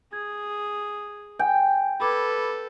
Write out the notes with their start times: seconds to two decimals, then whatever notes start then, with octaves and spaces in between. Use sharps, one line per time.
0.13 G#4 G#6
1.39 G5 G#5
2.00 A4 B4 B5 D6 G#6